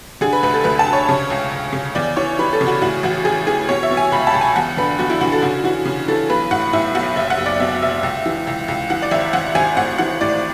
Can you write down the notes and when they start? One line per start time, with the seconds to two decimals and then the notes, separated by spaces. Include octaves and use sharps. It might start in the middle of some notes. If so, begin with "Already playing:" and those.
0.21 D3 G#4
0.33 B4
0.43 D2 B4
0.54 A4
0.64 D2 B4
0.79 A5
0.87 D2
0.93 C#5
1.09 C#3
1.30 C#2
1.52 C#2
1.73 C#3
1.95 E2 D5
2.17 E3 C#5
2.39 E3 B4
2.53 A4
2.61 C#3
2.67 F#4
2.82 A2 F#4
3.03 A1 F#4
3.25 A1 G#4
3.47 E3 G#4
3.69 B2 C#5
3.83 E5
3.90 B2
3.97 G#5
4.12 C#2 B5
4.27 A5
4.34 C#2
4.41 G#5
4.56 E2 F#5
4.77 D3 B4
4.99 E2 F#4
5.10 E4
5.21 D3 F#4
5.32 A4
5.42 C#3 F#4
5.64 E3 F#4
5.85 C#3
6.08 E3 A4
6.30 B1 B4
6.51 A2 F#5
6.73 A2 E5
6.95 B1 F#5
7.16 F#1 E5
7.30 F#5
7.38 F#1
7.46 D5
7.60 B2 E5
7.82 F#1 E5
8.03 C#2
8.26 E3
8.47 C#2
8.68 C#2
8.90 E3 F#5
9.02 D5
9.11 G#1 E5
9.33 G#1 F#5
9.55 G#1 G#5
9.77 A2 F#5
9.98 E3 F#5
10.21 A2 D5